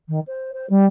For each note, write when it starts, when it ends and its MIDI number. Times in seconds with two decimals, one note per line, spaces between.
0.08 0.19 51
0.27 0.51 72
0.53 0.66 72
0.69 0.85 55